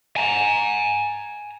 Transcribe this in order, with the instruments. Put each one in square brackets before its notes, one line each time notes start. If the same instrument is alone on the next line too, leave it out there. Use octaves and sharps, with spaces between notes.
[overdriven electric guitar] G#5 A#5